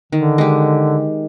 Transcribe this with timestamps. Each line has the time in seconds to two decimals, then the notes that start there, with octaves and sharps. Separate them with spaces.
0.12 D3 D#3
0.38 G#3 G4